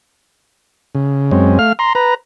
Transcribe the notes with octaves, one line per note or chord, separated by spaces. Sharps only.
C#3
F#2 G#3 C4 C#4
A3 F5 F6
A#5 C6
B4 A#5